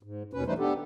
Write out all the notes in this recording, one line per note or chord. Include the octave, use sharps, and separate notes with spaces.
G#2
D#2 B2 C#4 B4
E3 G3 A3 D#4 B4 C5
B3 D4 G4 A4